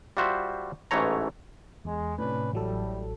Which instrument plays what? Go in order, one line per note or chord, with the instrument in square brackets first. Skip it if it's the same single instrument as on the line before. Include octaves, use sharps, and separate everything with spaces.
[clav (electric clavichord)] G3 F4 F#4 C5 E5
A1 G#2 E3 A3 C#5 A#5
[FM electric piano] E2 [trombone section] G#3
[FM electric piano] A2 C3 [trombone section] C#4 D4 B4
[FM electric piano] A1 F#3 A4 [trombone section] A2 G3